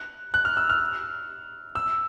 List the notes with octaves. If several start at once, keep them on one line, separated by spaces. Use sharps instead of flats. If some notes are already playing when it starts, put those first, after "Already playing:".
Already playing: F#6
F#6
F6
E6
F6
E6